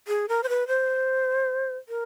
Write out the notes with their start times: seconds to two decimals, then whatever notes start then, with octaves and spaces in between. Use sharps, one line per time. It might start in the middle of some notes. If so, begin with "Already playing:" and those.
0.08 G#4
0.29 A#4
0.43 C5
0.49 B4
0.68 C5
1.89 A#4